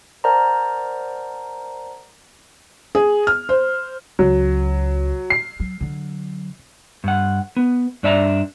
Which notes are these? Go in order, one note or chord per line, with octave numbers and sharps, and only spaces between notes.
A#4 C5 D5 F#5 A5 A#5
G#4
F6
C5
C#2 F#3
C7
F#3
D3 F#3
G2 F#5
B3
G2 D4 D5 E5 A5 A#5